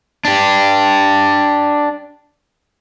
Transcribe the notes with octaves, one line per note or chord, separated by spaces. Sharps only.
D4 G4